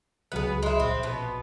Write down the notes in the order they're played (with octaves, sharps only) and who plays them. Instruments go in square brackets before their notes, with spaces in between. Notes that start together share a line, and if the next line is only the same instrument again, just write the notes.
[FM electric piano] C#2 F#3 F#6 [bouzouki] B3 G#4
[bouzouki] G#3 E4
[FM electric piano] A#1 [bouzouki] C4
[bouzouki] B2 B3